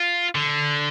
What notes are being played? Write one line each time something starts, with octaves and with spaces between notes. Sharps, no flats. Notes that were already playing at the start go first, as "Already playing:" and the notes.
Already playing: F4
D3